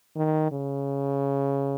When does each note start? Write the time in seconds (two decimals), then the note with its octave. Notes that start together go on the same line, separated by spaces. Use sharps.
0.16 D#3
0.52 C#3